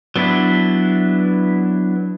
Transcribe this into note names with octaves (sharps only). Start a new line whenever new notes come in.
F#3 B3 D4 E4